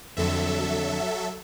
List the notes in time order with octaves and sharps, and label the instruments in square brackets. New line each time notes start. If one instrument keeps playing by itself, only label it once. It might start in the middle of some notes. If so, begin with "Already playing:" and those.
[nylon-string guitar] F2 D3 C4 [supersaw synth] F#3 A4 E5